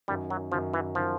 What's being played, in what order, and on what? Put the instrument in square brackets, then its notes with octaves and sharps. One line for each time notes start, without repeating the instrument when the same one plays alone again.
[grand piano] F#2 D#3 F#3 [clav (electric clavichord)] G3
[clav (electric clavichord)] F#3
[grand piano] F#2 D#3 F#3 [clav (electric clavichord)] F3
[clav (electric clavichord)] E3
[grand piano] D#3 F#3 [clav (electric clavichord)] F3